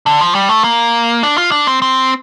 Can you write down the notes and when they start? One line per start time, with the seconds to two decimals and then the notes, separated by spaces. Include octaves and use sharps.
0.06 D3
0.21 F3
0.35 G3
0.49 A3
0.64 A#3
1.23 D4
1.38 F4
1.51 D4
1.67 C4
1.82 C4